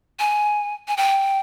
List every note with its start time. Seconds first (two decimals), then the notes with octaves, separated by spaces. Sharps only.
0.19 G#5
0.88 G#5
0.97 G5